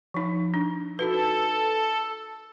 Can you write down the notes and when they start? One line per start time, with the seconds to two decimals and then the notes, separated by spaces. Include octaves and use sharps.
0.14 F3 D#4
0.54 D4
0.99 D#4 F#4 A4 B4